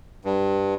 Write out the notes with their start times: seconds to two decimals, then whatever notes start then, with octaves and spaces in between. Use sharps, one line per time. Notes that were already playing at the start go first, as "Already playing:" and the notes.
0.25 G2